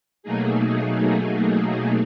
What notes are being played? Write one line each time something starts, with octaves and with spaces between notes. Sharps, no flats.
B2 F#3 A3 A#3 D#4 G#4